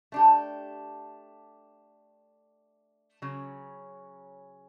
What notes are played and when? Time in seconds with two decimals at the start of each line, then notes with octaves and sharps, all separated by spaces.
0.12 A3 D4 G4
3.22 C#3 F#3 C#4